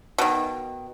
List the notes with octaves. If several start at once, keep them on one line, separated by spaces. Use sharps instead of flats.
B2 D#3